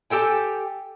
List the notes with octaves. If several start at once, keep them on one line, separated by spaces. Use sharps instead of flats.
G4 A4 G5 G#5